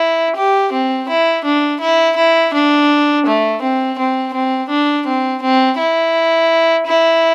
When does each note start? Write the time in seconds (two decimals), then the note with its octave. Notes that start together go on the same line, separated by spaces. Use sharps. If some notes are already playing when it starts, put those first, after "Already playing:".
Already playing: E4
0.36 G4
0.72 C4
1.09 E4
1.45 D4
1.80 E4
2.16 E4
2.54 D4
3.26 A3
3.62 C4
3.98 C4
4.34 C4
4.70 D4
5.07 C4
5.42 C4
5.78 E4
6.87 E4